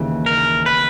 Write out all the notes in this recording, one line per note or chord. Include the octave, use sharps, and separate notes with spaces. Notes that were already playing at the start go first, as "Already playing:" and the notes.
Already playing: D#2 C#3 E3
A#4
B4